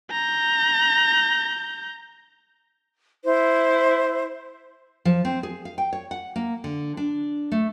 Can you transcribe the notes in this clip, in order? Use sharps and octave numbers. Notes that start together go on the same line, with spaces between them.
A#5 G6
E4 C5
F3
C4
G#4
F5
G5
C#5
F#5
A#3
D3
D4
A3